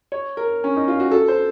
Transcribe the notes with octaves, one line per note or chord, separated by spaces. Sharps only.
C#5
A#4
C#4
D#4
F4
F#4
A4
C5